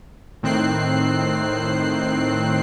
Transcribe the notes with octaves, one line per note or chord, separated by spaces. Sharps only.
A2 D#3 C4 F#6 C7